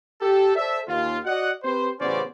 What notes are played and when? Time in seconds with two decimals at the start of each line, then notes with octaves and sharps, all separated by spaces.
0.21 G4 A4
0.56 A4 C5 D5 E5
0.89 D#2 F4
1.25 F#4 D5 D#5 F#5
1.64 C4 G4 B4 C5
2.00 A1 C#3 B3 C#4 C5 D5